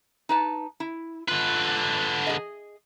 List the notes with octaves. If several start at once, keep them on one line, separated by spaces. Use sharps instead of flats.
D#4 B4 A5
E4
D3 F4 B4
G#4 D#5